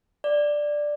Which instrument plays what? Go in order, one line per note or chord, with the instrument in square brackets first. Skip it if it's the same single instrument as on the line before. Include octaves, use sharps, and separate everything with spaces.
[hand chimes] D5